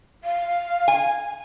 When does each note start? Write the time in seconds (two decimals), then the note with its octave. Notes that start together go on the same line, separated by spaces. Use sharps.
0.24 F5
0.88 G#5